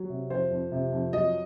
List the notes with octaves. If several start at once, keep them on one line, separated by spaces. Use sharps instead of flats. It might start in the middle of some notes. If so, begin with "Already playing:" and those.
Already playing: F#3
C3
F2 C5
F2
C3
F2
F#3 D#5